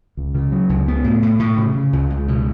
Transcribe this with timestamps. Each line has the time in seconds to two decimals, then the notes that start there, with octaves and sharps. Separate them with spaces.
0.17 C#2
0.35 C#3
0.52 F#3
0.69 C#2
0.88 B3
1.04 A2
1.22 A2
1.39 A2
1.57 C#3
1.75 C#3
1.93 C#2
2.10 C#2
2.28 B2